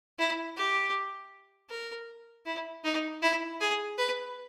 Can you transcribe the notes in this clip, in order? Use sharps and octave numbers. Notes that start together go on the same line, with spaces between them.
E4
G4
A#4
E4
D#4
E4
G#4
B4